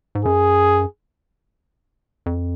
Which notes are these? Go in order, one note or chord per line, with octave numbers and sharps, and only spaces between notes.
G#2
F#2 G#4
F2